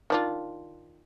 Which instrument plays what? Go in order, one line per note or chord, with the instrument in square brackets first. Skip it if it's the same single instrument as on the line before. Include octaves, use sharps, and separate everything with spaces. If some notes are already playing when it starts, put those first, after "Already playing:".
[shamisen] D#3 D4 F4